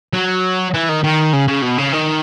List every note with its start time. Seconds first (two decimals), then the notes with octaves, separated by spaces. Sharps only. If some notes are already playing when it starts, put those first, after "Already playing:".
0.13 F#3
0.74 E3
0.89 D#3
1.04 D#3
1.33 C#3
1.48 C#3
1.62 B2
1.78 C#3
1.93 D#3